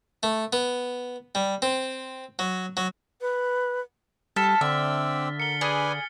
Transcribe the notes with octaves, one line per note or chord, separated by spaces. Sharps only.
A3
B3
G3
C4
F#3
F#3
B4
G3 A4 F6 A6 B6
D3 C4 D5 E5 E6
A#4 C#7 G7
G#4 B4 D5 G#5